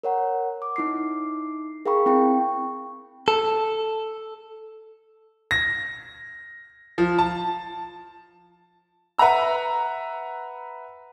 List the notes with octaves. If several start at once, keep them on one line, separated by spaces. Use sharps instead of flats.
A#4 C#5 F#5 A#5
D6
D#4 E4 D6 C7
G#4 A#4 F5 G5 B5 C#6
C4 E4 G5 C#6
A4
A#6
F3
A5
B4 E5 F#5 A#5 E6